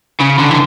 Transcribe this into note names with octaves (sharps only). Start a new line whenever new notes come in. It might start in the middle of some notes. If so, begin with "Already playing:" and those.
C#3
D3
E3